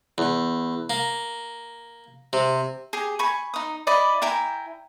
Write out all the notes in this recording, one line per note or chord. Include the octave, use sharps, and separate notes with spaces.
E2
A#3
C3
G4 G#4
G#5 B5 C#6
D#4 D#6
E4 D5 D#5 B5
E4 G5 G#5 A#5